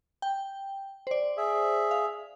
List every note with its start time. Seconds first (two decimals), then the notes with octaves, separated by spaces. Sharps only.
0.22 G5
1.07 C5 D5
1.37 G#4 E5
1.91 F5